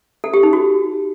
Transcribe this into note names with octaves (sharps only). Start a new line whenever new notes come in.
A4
G4
D#4
F#4